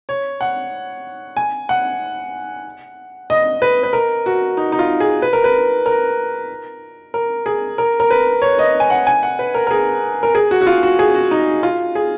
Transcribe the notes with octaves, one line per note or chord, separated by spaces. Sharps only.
C#5
F#5
G#5
F#5
D#5
B4
B4
A#4
F#4
D#4
D#4
F4
G#4
B4
A#4
B4
A#4
A#4
G#4
A#4
A#4
B4
C#5
D#5
G#5
F#5
G#5
F#5
B4
A#4
A#4
G#4
A#4
G#4
F#4
F#4
F4
F#4
G#4
F#4
D#4
F4
G#4